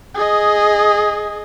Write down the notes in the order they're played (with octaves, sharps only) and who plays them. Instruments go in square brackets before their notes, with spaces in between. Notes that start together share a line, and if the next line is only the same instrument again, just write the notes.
[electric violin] G#4 D#5